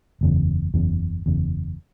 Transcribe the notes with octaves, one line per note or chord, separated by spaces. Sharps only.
F#1 E2 C#3
F#1 E2 C#3
F#1 E2 C#3